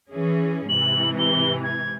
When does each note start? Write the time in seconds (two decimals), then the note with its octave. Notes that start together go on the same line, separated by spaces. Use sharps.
0.10 E3 C#4 G#4
0.69 G#2 C3 E3 F#7
1.19 G7
1.63 G#6